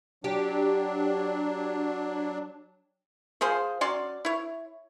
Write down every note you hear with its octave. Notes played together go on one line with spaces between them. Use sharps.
F#3 D4 G4
F3 F4 G#4 C5
F#3 C#4 D5 C6
E4 C#5